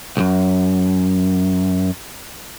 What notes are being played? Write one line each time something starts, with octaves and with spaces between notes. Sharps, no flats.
C2 F#2